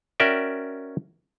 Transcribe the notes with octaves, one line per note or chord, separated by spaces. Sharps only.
C#4 F#4 A#4 D5 E5 G5